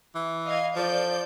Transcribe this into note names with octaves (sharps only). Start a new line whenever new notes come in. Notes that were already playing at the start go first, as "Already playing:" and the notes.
E3
D#5 F5 G#6
F3 A4 D5 G6